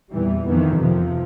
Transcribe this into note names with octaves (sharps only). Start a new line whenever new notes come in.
E2 A#2 E3 G3
F2 D#3 E3 B3
C3 F3